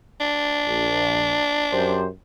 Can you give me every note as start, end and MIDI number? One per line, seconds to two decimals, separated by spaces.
0.20 1.98 62
0.66 1.36 34
1.71 2.05 42
1.71 2.05 67
1.71 2.05 72